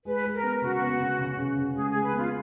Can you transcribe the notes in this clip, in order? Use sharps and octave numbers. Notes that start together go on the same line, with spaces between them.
G#3 B4
G#3
A#4
B3
C#3 F#4
B3
C#3
C#3
C#3
C#3
G#3 G#4
G#3 G#4
B4
B3 F4